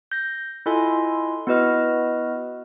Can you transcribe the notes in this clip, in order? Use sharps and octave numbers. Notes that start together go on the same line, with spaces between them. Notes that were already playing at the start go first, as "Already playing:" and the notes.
G6 A#6
E4 F4 A4 D#5 G#5 C6
B3 E4 F#4 B4 D#5 F6